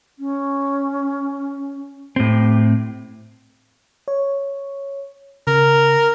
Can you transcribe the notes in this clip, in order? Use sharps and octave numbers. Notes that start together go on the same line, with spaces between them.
C#4
A2 C4 G4
C#5
C#3 A#4